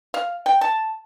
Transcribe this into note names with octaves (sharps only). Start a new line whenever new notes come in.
F5
G5
A5